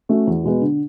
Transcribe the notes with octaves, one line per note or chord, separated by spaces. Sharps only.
A3 C#4 F#4
E2
B2 G#3 B3
D3